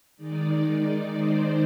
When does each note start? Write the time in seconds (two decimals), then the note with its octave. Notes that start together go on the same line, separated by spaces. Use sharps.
0.17 D#3 G#3 D#4 D5
0.80 D5
1.12 C5